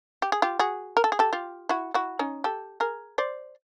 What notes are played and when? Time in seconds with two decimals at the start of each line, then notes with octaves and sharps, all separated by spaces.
0.22 G4
0.32 G#4
0.42 F4 G4
0.59 F#4 G#4
0.97 A#4
1.04 A4
1.12 G#4
1.19 G4 A4
1.33 F4 G4
1.69 E4 F#4
1.94 E4 F#4
2.19 C#4 D#4
2.44 G4 A4
2.80 G#4 A#4
3.18 C5 D5